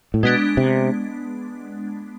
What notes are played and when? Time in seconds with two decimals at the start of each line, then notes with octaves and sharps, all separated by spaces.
0.14 A2
0.23 B2 G#3 B3 D4
0.57 C3